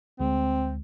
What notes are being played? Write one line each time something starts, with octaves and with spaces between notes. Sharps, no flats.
D2 G#3 C4